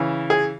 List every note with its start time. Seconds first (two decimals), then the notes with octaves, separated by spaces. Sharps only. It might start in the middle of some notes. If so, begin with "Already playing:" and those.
Already playing: C#3 E3
0.30 G#4